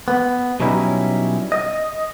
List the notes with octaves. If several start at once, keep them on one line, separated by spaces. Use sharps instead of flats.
B3
B2 F#3 G3 C#4 D#4 E4
D#5